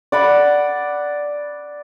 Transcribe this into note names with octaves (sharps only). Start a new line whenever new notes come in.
D5 F#5 B5